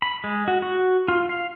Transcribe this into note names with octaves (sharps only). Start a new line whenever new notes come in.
B5
G#3
F#4
F#4
F4
F5